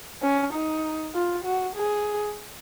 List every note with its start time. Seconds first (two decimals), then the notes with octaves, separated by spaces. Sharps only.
0.22 C#4
0.53 D#4
1.14 F4
1.44 F#4
1.76 G#4